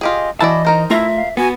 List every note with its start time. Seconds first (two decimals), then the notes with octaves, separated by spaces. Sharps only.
0.01 F4 G4 G#4 D#5
0.41 E3 E4 F#4 D5 D#5 A5
0.65 D#4 A#4 C5
0.90 A3 E4 F4 E5 A#5
1.16 F5
1.37 B3 F#4 G#5